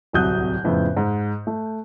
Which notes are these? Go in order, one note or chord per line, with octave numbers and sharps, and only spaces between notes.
D1 C2 F#3 D#6 F#6 G6
F2 A2 C#3 B3
G#2
A3